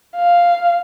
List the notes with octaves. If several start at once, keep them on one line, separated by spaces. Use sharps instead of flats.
F5